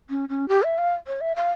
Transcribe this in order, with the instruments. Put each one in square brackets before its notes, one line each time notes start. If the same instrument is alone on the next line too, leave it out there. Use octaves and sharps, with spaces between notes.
[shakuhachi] C#4
C#4
G4
E5
F5
C#5
E5
F5